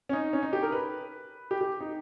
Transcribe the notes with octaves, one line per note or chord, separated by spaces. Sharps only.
C#4
D#4
C#4
D#4
G4
A#4
B4
G4
G4
D#4